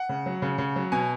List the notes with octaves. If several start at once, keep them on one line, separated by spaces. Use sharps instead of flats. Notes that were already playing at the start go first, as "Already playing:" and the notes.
Already playing: F#5
C#3
F#3
C#3
C#3
F#3
B2 G#5